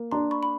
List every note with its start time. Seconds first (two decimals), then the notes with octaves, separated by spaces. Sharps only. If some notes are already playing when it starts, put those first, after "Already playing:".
Already playing: A#3
0.11 D4 A#5 C6
0.31 B5 C#6
0.43 B5